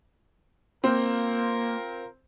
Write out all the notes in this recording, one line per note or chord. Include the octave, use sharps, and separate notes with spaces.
A#3 C4 F4 A#4